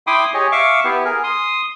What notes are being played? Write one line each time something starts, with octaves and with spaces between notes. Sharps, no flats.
E4 G5 B5 C6 D6 D#6
G4 G#4 C#5 D#5
E5 F5 C#6 D6
B3 E4 G4
G#4 A#4
C6 D#6